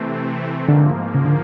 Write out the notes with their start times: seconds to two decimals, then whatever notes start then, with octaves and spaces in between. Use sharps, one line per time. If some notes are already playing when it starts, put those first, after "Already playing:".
Already playing: C3 E3 A3 C4
0.69 G#2 D3 F3 A#3
1.15 C#3
1.25 D3